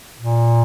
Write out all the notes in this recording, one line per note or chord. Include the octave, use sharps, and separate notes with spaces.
A#2